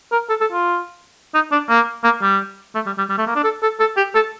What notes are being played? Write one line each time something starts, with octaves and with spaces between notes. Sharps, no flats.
A#4
A4
A4
F4
D#4
D4
A#3
A#3
G3
A3
G3
G3
G3
A3
A#3
D4
A4
A4
A4
G4
A4